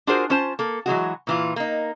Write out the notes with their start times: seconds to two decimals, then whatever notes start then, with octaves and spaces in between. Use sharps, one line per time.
0.07 D4 F4 F#4 G#4 A#4 C5
0.30 C#4 F4 C5 A5
0.59 A#3 A4
0.86 E3 F#3 G#3 F#4
1.27 A#2 E3 F4
1.56 A#3 D#4